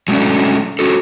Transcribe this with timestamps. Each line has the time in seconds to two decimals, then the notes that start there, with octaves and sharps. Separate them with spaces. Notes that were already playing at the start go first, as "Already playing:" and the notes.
0.08 F#3 G#3 A3 C#4 D4
0.79 C#4 F#4 A4